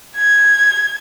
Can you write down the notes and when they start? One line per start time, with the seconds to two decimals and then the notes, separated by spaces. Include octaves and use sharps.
0.17 G#6